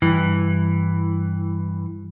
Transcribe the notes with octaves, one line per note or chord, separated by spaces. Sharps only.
G2 E3